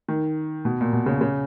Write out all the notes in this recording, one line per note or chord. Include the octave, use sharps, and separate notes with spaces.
D#3
B2
A#2
B2
C#3
C#3